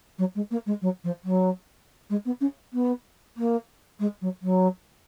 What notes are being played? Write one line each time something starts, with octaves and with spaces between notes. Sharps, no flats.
F#3
G#3
A#3
G#3
F#3
F3
F#3
G#3
B3
C#4
B3
A#3
G#3
F#3
F#3